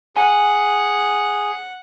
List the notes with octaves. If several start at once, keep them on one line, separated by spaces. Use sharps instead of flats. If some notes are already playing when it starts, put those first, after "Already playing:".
G#4 F#5 G#5